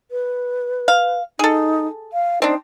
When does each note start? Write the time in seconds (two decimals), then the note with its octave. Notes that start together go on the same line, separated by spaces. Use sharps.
0.11 B4
0.88 F5
1.39 D#4 G#4 A4
2.13 F5
2.42 C4 D4 D#4